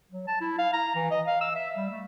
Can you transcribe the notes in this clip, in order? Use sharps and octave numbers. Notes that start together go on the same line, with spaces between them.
F#3
A5
E4
F5
A#5
E3
D#5
F5
E6
E5
G3
A3